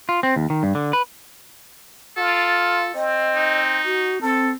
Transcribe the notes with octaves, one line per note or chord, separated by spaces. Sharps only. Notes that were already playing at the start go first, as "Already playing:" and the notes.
F4
C4
D#2
D#3
G2
D3
B4
F4 A4
C4 D#5
D#4
F#4
C4 A4